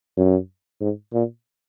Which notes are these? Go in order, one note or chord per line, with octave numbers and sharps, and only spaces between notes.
F#2
G#2
A#2